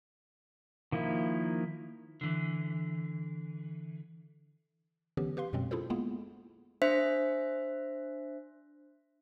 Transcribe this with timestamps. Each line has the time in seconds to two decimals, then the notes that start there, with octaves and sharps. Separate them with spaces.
0.92 D#3 F3 A#3 E4
2.21 D3 E3
5.17 D3 E3 F#3 B3 C#4 G4
5.37 G4 B4 F5 C6
5.53 F#2 B2 F#3 G#3 C4 C#4
5.71 D4 E4 F4 G#4 A4 C5
5.90 G#3 A#3 B3 E4 F4 G#4
6.82 D4 C5 E5 B6